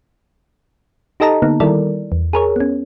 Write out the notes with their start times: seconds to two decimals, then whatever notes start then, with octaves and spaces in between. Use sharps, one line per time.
1.20 D#4 G4 A4 D#5 A5 A#5
1.42 D3 A#3 B3 D#4
1.60 D#3 G3 E4 A4 A#4 D5
2.12 E2
2.33 G#4 A#4 C#5
2.56 B3 C#4